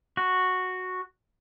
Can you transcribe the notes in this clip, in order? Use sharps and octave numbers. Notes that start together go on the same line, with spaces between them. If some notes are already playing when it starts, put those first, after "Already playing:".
F#4